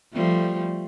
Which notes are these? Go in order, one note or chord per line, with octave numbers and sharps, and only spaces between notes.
F3 G3 A3